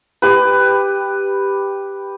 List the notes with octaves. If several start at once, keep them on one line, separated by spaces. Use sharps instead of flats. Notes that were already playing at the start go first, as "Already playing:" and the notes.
G4 B4